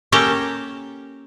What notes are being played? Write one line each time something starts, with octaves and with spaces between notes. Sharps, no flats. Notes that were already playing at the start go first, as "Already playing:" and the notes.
A#3 C#4 G4 A4 G5 A#5